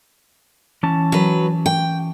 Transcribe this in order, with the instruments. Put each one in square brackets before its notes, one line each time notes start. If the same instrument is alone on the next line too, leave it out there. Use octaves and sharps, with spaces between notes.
[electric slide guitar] E3 C#4 A5
[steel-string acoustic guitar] F#3 B4
G5